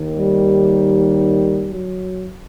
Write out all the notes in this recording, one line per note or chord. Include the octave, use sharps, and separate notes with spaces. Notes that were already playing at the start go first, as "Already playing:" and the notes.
Already playing: D#2 D#3
G3
F#3